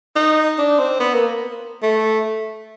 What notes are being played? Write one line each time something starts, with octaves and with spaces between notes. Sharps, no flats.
D#4
D4
C4
B3
A#3
A3